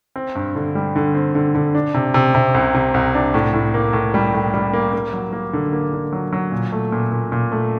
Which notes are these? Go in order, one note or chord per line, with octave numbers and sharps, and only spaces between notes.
C4
G2
D3
G3
D3
C4
D3
D3
D4
C3
C3
C3
C2
C3
C2
D4
A2
A2
A#3
A2
G3
A2
G3
A#3
A#3
F#3
A#3
D3
A#3
D3
F#3
F#3
A#2
A3
A#2
A#2
A#2
A3